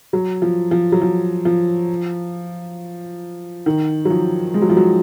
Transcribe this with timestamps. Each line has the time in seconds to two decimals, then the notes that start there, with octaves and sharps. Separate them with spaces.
0.13 F#3
0.42 F3
0.71 F3
0.92 F#3
1.02 F3
1.45 F3
3.66 D#3
4.05 F#3
4.10 F3
4.54 G#3
4.62 F#3
4.70 F3
4.77 F#3